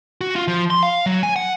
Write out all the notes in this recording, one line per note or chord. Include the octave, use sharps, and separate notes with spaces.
F#4
F4
F3
C6
F5
F#3
G#5
F#5